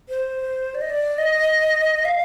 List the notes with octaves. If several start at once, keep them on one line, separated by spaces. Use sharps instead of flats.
C5
D5
D#5
D5
D#5
F5